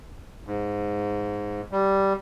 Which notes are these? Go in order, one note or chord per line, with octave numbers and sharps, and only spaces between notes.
G#2
G3